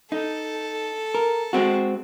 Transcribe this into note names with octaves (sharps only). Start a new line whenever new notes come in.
D#4 A4
A#4
G#3 C4 F#4